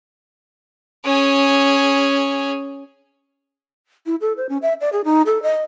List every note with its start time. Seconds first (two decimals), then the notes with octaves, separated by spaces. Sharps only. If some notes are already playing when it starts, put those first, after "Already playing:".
1.05 C#4 G#4
4.06 E4
4.21 A4
4.37 C5
4.49 C#4
4.62 E5
4.81 D5
4.93 G#4
5.05 D#4
5.26 A4
5.43 D#5